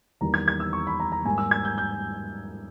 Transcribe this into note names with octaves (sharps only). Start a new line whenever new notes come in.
E2 D#3 G3 A#3 A#5
G#6
G#6
E6
C#6
B5
A#5
A#5
G#2 G3 A#3 G#5
E6
G#6
G6
G6